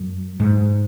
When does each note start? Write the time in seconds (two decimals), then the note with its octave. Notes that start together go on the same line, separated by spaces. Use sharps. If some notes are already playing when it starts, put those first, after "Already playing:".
Already playing: F#2
0.40 G#2